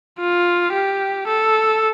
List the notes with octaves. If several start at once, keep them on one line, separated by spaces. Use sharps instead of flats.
F4
G4
A4